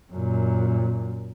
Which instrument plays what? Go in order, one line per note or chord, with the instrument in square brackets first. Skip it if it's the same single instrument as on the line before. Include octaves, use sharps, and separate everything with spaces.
[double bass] F#2 A#2